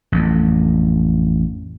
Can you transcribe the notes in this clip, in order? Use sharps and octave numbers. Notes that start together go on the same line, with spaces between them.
A1 F2